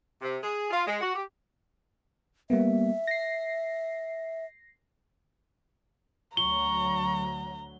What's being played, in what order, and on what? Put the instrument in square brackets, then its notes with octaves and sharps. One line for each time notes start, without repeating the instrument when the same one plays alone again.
[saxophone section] C3
G#4
F4
G#3
F#4
G4
[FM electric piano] G3 A#3 B3 [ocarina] E5
[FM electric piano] A#6 C7
[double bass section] D2 F#3 [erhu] A#5 [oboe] C#6 [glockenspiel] G7